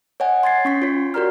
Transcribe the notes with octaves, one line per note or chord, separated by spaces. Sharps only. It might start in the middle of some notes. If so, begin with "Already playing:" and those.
C#5 D#5 F#5 G#5
C6 G#6 A6 C7
C#4 C#6 B6 C7
F4 C#5
F#4 G4 A#4 D5 A#5 F6